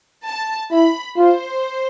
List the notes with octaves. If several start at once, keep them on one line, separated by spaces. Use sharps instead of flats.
A5
E4 B5
F4 C5